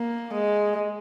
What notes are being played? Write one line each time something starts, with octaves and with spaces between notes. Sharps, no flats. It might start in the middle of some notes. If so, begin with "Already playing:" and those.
Already playing: A#3
G#3